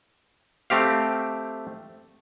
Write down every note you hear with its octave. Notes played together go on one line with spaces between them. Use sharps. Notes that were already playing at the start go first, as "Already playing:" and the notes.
A3 C4 G4 F5